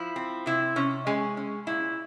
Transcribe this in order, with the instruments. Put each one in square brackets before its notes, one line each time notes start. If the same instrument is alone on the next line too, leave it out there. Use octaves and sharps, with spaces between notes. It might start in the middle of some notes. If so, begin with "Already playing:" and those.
Already playing: [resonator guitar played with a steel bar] F3 E4
C4
C3 E4
C3 C#4
G#3 C#4
C#4
A#2 E4